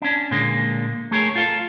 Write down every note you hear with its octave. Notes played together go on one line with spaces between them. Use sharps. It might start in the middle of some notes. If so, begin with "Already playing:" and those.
C#4 D4
A#2 D3 G#3 A#3
A3 G#4 A#4 C#5
F4 A4 F5